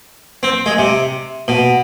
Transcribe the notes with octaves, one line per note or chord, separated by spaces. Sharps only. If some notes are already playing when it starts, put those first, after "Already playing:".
C4
G#3
C3
B2